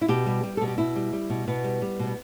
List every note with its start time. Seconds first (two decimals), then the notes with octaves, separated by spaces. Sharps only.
0.01 E4
0.08 B2 G4
0.26 G3
0.43 G3
0.57 B2 A4
0.68 G4
0.78 B2 E4
0.96 G3
1.13 G3
1.30 B2
1.48 B2 B3
1.64 G3
1.82 G3
1.99 B2
2.07 B3